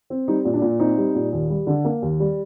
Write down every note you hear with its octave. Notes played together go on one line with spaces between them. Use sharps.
C4
G3 D#4
A#2
D4
A#2
C4 D#4
G3
A#2
D#2
G3
D3
A#3
D#2
G3